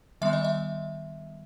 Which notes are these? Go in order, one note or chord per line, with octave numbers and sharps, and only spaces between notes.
D#3 G3 B3 E5
D#5
E5